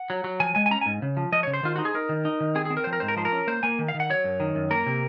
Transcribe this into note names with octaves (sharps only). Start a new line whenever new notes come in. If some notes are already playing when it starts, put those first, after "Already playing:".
Already playing: F#5
F#3
F#3
F3 G#5
G#3 G#5
G#5
C#4 A#5
G#2 G#5
C#3
F3
F3 D#5
C#3 C#5
C5
D#3 F4
D#4 F#4
G#4
D#4 A#4
D#3
D#4
D#3
C4 G#4
G#4
C4
A#4
F3 C5
A#4
G#2 C5
A#4
F3 C5
A#4
C#4
A#3 C5
A#3 G#5
D#3
F5
D#3
F#5
F#3 C#5
F#2
D#3
F#2
A#3 A#4
C3